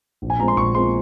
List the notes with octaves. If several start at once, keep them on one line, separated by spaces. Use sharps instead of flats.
A#1
G#5
A#2 G#3 C4 A#5
C6
A#1 C#6
A#2 G#3 C4 C6